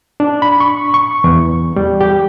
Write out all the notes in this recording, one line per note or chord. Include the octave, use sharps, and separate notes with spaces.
D4
B5
C#6
C#6
E2
G3
G4